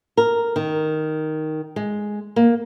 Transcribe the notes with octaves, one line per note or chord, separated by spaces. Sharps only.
A#4
D#3
G#3
A#3